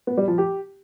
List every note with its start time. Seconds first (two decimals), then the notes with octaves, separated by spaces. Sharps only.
0.07 B3
0.17 G3
0.28 F3
0.38 G4